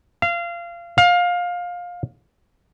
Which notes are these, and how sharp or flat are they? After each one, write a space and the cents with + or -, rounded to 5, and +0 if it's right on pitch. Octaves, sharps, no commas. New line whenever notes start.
F5 -25
F5 +20